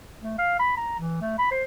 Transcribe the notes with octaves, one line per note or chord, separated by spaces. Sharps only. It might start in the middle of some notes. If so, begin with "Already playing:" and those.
A3
F5
B5
A#5
E3
A3
B5
C5